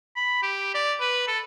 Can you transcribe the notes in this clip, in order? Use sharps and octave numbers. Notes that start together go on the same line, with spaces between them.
B5
G4
D5
B4
A4